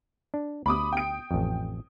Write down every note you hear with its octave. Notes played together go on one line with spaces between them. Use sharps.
D4
D2 B5 D6 D#6
G5 D7
A1 F2